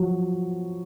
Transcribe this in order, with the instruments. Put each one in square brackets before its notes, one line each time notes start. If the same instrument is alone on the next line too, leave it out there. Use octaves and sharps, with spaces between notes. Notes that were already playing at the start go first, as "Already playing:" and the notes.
Already playing: [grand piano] F3 F#3